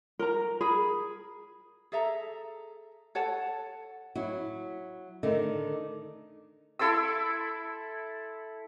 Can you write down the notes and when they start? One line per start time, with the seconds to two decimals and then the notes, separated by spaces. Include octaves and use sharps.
0.19 A#4 A#5
0.61 G#4 B5
1.92 G#4 A4 E5 A#5
3.15 A4 C#5 F#5 A5
4.15 F#3 E4 F#4
5.23 D3 D#3 A3 D#4
6.79 E4 A4 C6 E6